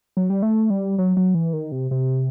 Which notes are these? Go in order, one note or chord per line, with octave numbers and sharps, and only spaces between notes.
F#3
G3
A3
G3
F#3
F#3
E3
D#3
C3
C3